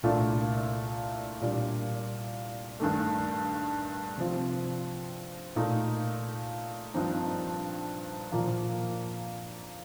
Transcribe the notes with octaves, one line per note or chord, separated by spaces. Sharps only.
C2 A#2 A3 D4 F4
A#2 G3 D4
G2 D#3 A3
C3 F3 C4 F4
A#2 A3 D#4
G2 F3 C4 D#4
A#2 F3 A#3